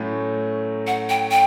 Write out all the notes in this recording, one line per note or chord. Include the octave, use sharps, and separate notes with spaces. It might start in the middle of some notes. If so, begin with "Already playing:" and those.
Already playing: A2 F#3 A3 C#4
F#5
G5
G5